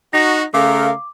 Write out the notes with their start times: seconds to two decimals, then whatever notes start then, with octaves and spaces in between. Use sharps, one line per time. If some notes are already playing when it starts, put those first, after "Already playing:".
0.13 D#4 F#4 A#6
0.54 C#3 A3 A#4 F5 D6